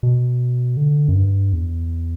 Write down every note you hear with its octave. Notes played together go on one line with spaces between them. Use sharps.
B2
D3
F#2
G2
E2